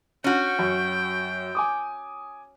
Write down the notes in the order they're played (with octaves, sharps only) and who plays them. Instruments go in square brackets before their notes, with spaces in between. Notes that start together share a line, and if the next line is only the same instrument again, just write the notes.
[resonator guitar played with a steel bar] C#4 F#4 [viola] G5
[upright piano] F#2
G#5 D6 D#6